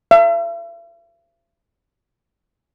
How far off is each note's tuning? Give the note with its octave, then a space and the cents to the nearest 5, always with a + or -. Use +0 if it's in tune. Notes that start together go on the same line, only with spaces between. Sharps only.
E5 +45